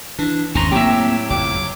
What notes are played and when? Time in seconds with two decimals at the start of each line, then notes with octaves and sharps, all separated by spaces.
0.19 E3 D4
0.55 G#1 E2 D#3 C#4 G#5 A#5 C6 C#6
0.72 A2 F#3 A#3 C4 G4 E5
1.30 F#1 F2 D6